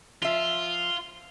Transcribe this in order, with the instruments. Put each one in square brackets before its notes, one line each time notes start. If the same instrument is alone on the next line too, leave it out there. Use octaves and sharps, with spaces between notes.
[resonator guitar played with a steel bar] F3 E5 [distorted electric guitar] F4